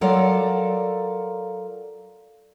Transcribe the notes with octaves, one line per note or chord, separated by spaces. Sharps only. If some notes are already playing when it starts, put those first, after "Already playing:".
F#3 F4 A4 A#4 D5 F5